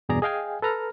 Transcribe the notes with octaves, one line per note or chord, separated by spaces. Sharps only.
E2 G2 B2 G#4 D5 A#5
G#4 D#5 F5 G5 G#5
A4 B4 A#5 F6